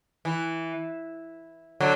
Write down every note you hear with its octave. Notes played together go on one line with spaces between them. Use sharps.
E3
D3 F#3